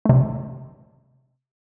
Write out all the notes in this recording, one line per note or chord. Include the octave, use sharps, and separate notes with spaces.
C3 A3